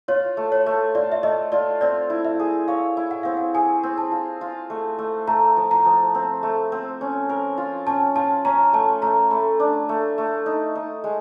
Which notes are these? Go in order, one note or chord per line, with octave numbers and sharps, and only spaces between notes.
F4 C#5
A3
C#5
A3
F4 D5
E5
A3 D#5
F4 D5
C4 D5
E4
E5
G#4
C#5 F5
E4
F#5
C4 F5
F#5
G#4 G#5
C4
A5
F4
F4
A3
A3
A3 A#5
F3
A#5
F3
C4
A3
C4
C#4
A#4
F4
C#4 A5
F4 A5
C#4 A#5
A3 A5
A3 A#5
A3 B5
D4
A3
A3
D#4
D#4
G#3